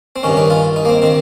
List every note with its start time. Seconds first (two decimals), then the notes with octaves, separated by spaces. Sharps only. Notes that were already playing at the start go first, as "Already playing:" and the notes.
0.16 C4
0.23 G2 D#3 C#4
0.37 D#4
0.50 F4
0.76 D#4
0.85 A#3
0.89 C4
1.02 D#3 C4